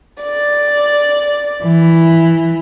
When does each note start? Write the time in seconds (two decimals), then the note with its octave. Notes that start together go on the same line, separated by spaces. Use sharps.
0.23 D5
1.63 E3